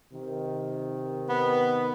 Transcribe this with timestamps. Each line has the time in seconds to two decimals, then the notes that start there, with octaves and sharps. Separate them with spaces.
0.12 C3 D#3
1.29 B3